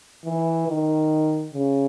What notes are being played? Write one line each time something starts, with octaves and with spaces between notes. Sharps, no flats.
E3
D#3
C#3